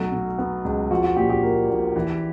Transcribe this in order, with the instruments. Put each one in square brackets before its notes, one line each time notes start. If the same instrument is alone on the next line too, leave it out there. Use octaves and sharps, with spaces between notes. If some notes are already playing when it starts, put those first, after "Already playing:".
Already playing: [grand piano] B1 F#3 A3
B2
B3
C#2
F3 F#4
F#4
A#2 G4
G4
A#3
A#1
E3